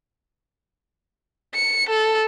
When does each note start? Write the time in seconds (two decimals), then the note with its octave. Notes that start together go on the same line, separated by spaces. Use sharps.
1.55 C#7
1.89 A4